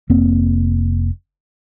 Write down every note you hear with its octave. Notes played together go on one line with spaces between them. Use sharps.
F1 A#3 C4